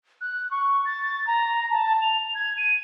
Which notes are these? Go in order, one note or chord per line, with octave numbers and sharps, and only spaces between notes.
F#6
C#6
A6
A#5
A5
F7
G#6
D#7